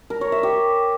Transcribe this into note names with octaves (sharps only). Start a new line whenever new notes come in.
A#4
C#5
E5
G4